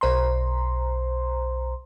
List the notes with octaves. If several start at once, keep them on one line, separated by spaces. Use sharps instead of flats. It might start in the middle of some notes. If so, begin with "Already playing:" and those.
B1 C5 A#5 C6